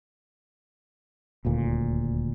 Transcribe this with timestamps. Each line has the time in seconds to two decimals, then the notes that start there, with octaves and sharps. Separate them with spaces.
1.45 D#1 D2 A#2